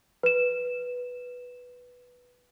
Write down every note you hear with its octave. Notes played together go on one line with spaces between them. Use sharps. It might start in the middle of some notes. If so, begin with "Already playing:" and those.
B4 E7